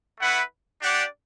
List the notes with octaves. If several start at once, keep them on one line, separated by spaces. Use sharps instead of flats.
A3 E4 B4 F#5
D4 G4 D5 F#5